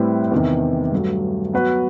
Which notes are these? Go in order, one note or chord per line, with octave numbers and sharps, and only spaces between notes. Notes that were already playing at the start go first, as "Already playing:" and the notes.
Already playing: A2 G3 C4 E4 B4
E2 C3 D#3
G2 F#3 A3
F#3 B3 F#4 B4